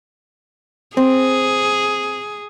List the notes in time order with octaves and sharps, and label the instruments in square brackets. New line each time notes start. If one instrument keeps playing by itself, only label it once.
[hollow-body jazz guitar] C4 [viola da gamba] G#4